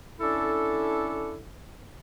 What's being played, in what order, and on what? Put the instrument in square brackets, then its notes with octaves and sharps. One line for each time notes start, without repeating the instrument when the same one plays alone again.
[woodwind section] C#4 D4 E4 A4